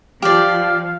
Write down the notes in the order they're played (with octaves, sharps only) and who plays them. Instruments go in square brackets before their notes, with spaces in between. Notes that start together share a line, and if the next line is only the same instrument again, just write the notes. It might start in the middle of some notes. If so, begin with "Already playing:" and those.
[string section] F3 [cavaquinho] G4 D5 [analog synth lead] F5